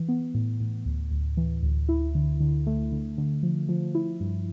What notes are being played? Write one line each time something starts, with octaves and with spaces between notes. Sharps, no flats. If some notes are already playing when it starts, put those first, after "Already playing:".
Already playing: E3
B3
A2
A2
D2
D2
E3
D2
E4
D3
D3
A3
D3
D3
F3
F3
E4
G2